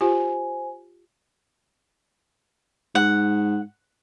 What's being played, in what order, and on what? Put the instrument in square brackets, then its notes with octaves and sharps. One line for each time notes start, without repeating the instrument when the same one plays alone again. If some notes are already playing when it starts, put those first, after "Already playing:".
[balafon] F4 G4 [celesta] C5 G#5
[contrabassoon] G#2 [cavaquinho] F#5